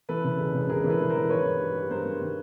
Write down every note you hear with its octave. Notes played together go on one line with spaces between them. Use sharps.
E3 A4 B4
C#3
E1
C#3
E1 G#4 A#4
E3
A4 B4
E3
A#4 C5
E3
D#3 B4 C#5
G2
G3
G3
G2 A#4 C5
G2
D#3